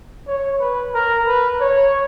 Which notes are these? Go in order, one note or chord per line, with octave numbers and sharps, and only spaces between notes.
C#5
B4
A#4
B4
C#5